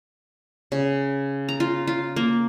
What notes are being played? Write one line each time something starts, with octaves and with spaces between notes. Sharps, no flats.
C#3
A#5
F4
F4
A#3